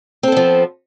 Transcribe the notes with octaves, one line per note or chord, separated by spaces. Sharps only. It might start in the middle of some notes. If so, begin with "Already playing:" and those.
F3 B3 C4 A4